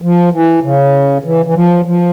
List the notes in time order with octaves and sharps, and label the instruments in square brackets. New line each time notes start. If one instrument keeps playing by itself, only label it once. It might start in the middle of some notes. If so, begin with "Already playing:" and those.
[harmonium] F3
E3
C#3
E3
E3
F3
F3